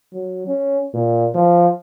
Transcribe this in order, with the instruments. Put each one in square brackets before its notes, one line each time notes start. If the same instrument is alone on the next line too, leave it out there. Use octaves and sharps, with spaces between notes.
[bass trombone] F#3
C#4
A#2
F3